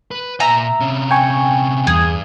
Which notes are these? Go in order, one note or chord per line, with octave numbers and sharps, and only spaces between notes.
B4
A#2 E5 G#5 A#5
C3 C#4
G5 G#5 C#6
E2 G2 G#4